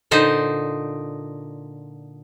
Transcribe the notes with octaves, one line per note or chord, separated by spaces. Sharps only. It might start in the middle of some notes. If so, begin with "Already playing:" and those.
A#2 D3 D#4 C5